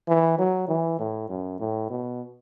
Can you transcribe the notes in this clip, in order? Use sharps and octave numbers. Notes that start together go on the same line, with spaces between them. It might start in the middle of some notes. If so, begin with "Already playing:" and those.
E3
F#3
E3
A2
F#2
A2
B2